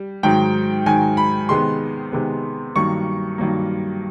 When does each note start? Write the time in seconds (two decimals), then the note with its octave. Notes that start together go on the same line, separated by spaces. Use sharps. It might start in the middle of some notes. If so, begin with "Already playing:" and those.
Already playing: G3
0.23 G#2 D#3 F#3 G5
0.86 G#2 D#3 F#3 G#5
1.17 B5
1.49 C3 D#3 G#3 B3 C6
2.12 C3 D#3 G#3 B3
2.76 G2 D#3 F#3 A#3 C#6
3.38 G2 D#3 F#3 A#3